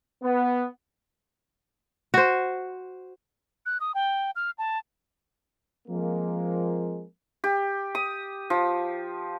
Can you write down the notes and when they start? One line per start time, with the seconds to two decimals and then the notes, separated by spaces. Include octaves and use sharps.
0.24 B3
2.14 F#4 C5
3.66 F#6
3.80 D#6
3.95 G5
4.36 F6
4.58 A5
5.88 F3 G#3 A#3 C4
7.44 G4
7.95 D#6
8.50 F3